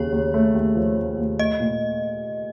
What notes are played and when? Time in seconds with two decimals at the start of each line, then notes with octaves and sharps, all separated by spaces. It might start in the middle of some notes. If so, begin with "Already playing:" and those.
Already playing: D#2 C#3 C#5
0.12 D#2
0.34 A3
0.55 D#2
0.75 F3
0.97 A3
1.18 D#2
1.39 A3 D#5
1.60 A#2